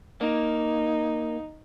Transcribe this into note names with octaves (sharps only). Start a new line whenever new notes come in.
A#3 D#4